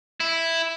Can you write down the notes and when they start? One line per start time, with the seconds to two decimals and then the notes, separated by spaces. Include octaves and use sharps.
0.20 E4